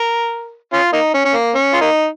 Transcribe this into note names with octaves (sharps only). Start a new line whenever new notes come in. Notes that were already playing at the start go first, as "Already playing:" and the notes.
Already playing: A#4
C#4 F4
A#3 D#4
C#4
C#4
A#3
C#4
F4
A#3 D#4